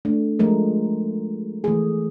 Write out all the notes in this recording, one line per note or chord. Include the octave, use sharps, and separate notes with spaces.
A3 D4
F3 G#3 A3 A#4
E3 A3 G#4